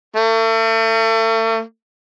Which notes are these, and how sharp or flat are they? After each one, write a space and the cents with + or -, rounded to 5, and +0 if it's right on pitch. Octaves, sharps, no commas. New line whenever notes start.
A3 +40